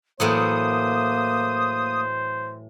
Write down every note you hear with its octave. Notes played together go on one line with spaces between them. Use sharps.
A2 E3 F#3 A#3 C5 D#6